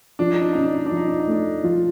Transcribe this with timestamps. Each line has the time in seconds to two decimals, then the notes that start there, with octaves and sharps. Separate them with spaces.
0.19 F3 D4
0.31 D#4
0.42 D4
0.53 C#4 D#4
0.64 D4
0.75 D#4
0.86 F3 D4
0.97 D#4
1.08 D4
1.20 D#4
1.27 A3 D4
1.64 F3 F4